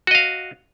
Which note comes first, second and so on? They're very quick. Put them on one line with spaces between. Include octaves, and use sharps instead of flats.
F#4 D#5 F5